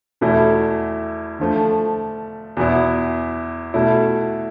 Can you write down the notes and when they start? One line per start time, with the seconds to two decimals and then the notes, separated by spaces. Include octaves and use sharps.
0.21 E2 B2 A3 E4
1.39 D3 F3 A3
2.57 E2 B2 B3 E4
3.74 B2 A3 E4